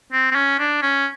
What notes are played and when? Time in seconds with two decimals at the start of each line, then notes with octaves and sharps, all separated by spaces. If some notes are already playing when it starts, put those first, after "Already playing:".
0.12 C4
0.31 C4
0.35 C#4
0.59 D4
0.82 C#4